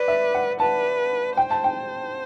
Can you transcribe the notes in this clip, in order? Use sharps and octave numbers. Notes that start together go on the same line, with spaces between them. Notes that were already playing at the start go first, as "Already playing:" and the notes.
Already playing: B4 D5
E5
F#5
B4 A5
C5 G5
A5
G5